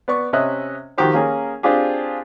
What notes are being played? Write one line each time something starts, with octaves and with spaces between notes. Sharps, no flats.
B3 D5 C#6
C3 C#4 D#5 E5 F#6
D#3 F3 F#4 G4 C5
A#3 C#4 G#4 A#4
C4 D4 F4 G4 G#4